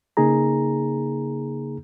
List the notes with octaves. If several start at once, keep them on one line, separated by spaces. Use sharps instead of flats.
C#3 A#3 D#4 G#4 A#5